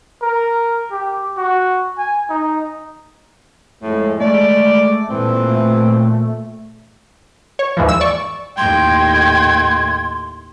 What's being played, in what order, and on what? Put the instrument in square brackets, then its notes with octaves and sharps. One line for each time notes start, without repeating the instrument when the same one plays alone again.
[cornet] A#4
G4
F#4
G#5
D#4
[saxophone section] F2 A2 [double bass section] G#3
[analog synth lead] A3 [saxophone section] D5
[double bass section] A#2 [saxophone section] E3 C4
[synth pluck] C#5
D#2 G#2 E3 F3
E6
D5 C#6
[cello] D#2 A2 [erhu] G5 [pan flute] C6 [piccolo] G#6